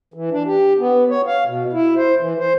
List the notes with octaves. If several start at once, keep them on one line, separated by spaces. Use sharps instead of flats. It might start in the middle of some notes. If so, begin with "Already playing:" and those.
E3
D4
G4
B3
C#5
F5
B2
E4
C5
E3
C5